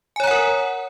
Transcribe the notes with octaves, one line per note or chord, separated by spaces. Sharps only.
A#4 C#5 F#5 G#5 A#5